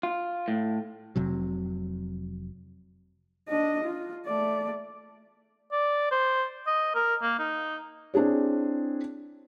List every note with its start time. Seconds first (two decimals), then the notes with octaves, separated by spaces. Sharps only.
0.03 F4
0.48 A2
1.16 F1 C3 F#3
3.49 D4 D#5
3.84 F4
4.26 A3 D5
5.72 D5
6.11 C5
6.67 D#5
6.95 A#4
7.22 A#3
7.39 D#4
8.14 C4 D4 E4 G#4 C#5